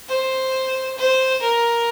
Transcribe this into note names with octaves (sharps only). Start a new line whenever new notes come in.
C5
C5
A#4